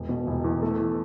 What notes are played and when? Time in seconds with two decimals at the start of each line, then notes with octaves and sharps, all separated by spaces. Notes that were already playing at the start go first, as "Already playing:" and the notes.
Already playing: E1
0.09 B2
0.27 E1
0.44 E2
0.62 A3
0.80 E3